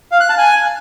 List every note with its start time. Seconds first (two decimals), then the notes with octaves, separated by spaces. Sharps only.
0.11 F5
0.20 F#6
0.29 A5
0.38 G#5